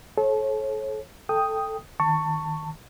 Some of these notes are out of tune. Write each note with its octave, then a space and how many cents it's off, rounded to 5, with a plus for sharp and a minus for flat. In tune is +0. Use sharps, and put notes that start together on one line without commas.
A4 -35 C#5 -35
A4 +0 G5 +10 D#6 +0
D#3 +0 A5 +25 C#6 +0